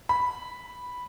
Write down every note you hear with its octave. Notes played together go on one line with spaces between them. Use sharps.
B5